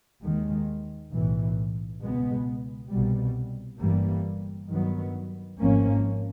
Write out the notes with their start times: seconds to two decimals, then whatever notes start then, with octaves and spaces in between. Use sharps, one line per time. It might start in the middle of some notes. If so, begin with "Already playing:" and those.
0.22 D#2 D#3 G#3
1.11 B1 A2 E3
2.01 C#2 B2 G#3 B3
2.90 C2 B2 G3
3.79 G1 G2 E3 G3 A#3
4.69 G2 D#3 F#3 B3
5.58 G#1 G#2 F3 A#3 C#4